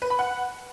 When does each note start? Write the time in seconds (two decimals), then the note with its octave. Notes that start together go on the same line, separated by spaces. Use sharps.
0.02 B4
0.10 B5
0.19 F#5